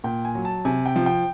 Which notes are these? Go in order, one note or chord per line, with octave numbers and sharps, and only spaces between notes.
A#2 G5
G#5
F#3
A5
C3 G#5
G5
F3
G5